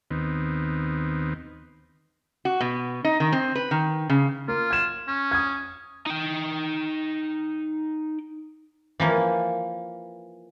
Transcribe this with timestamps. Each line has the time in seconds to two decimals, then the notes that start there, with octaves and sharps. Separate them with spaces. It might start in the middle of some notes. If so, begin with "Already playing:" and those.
0.11 D#2 D#3 B3 C4
2.45 F#4
2.61 B2
3.05 D#4
3.20 D#3
3.32 C4
3.55 B4
3.71 D#3
4.10 C#3
4.48 A#3 F4
4.71 G#6 E7
5.08 C#4
5.31 D#6 G#6
6.06 D#4 G5
9.00 E3 F3 A#3